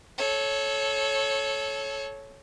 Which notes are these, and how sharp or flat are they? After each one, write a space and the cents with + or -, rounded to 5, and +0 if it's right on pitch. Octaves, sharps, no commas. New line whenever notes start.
A4 -20 C#5 +0